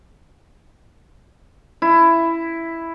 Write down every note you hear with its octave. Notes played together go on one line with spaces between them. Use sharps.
E4